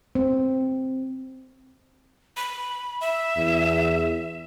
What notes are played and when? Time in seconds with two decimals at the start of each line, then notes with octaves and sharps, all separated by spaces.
0.15 C4
2.37 B5
3.01 E5
3.37 E2